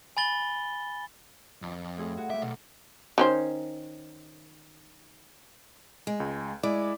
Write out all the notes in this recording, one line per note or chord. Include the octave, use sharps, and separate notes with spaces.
G#5 B5 A6 G7
F2
A2 F4 G#4
F#4
A3 E5 D6
B1
D#3 C#4 C5
G#3
C#2
G#3 E4 D5 D6